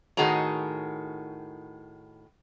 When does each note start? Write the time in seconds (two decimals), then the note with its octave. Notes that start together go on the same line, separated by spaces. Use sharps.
0.17 A2 D#3 F#4 G#4 C#5 A#5